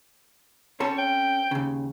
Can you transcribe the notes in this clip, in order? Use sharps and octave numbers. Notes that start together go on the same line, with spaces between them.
C4 C#4 A4 C#5
G5
D#2 C#3